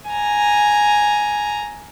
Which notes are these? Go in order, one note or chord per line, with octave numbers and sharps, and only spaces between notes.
G#5 A#5